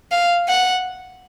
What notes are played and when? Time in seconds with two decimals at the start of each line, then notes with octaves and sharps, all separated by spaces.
0.12 F5
0.48 F#5